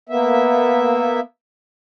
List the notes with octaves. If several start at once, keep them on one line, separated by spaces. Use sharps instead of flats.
A#3 B3 E5